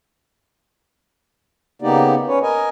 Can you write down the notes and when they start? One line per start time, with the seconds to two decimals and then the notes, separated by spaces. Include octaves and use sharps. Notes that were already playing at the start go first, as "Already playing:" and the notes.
1.82 C#3 A#3 B3 D#4 G4 D5
2.28 C#4 B4 C#5
2.42 A#4 D#5 G#5